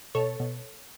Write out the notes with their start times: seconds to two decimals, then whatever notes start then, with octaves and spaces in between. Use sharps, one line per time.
0.15 B2 A4 C#5
0.40 B2